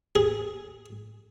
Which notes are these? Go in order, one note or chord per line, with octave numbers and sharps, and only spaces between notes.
G#4